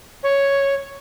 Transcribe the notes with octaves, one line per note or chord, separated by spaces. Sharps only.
C#5